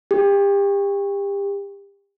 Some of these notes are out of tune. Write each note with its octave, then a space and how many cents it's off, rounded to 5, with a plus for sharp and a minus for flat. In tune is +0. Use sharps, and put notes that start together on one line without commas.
G4 +30